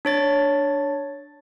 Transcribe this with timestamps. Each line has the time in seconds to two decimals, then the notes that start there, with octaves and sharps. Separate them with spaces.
0.05 D4 C#5 A6